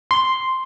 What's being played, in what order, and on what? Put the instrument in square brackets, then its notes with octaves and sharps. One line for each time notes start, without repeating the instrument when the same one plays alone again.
[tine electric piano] C6